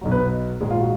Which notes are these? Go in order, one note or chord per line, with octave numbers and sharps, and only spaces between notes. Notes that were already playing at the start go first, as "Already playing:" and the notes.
B1 B2 F#3
B3 B4
A#1 G#2 D#3 G#3 G#4
F4
F#4